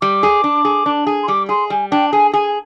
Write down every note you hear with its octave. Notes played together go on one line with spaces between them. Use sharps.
G3 D6
G#4
D4
G#4
D4
G#4
C6
G3 D6
G#4 C6
G3 G#5
D4 G5
G#4 G#5
G#4 G#5